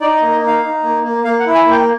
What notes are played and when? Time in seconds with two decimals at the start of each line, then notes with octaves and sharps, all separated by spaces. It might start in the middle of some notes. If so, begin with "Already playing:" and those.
0.01 D#4 D5
0.16 D#5
0.22 A#3
0.32 D#5
0.42 D#4
0.47 F5
0.63 D#4
0.83 A#3
1.04 A#3
1.24 A#3 F5
1.40 F#5
1.46 E4
1.55 G#5
1.65 A#3
1.71 G5